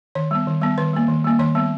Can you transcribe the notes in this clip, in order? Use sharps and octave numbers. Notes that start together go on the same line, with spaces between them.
D#3 C#5
G3 B3
D#3
G3 B3
D#3 B4
G3 A#3
D#3
G3 A#3
D#3 C#5
G3 B3